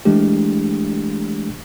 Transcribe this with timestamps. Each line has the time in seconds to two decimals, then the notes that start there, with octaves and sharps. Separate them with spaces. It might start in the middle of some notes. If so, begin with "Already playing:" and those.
0.05 E3 G#3 A3 D4 G4